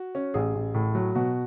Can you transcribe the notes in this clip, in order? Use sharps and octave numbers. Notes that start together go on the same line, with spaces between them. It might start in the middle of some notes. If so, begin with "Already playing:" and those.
Already playing: F#4
C#4
A1 G#4
A1
A2
F#3
B2 F#4